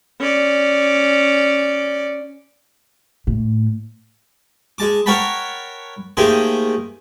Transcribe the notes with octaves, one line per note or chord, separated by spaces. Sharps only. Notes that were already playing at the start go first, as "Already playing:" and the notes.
C#4 D5
A2
G#3 A5 D6
A#4 C#5 F#5 G5 A5 B5
D#3 A3 A#3 G4 G#4 C5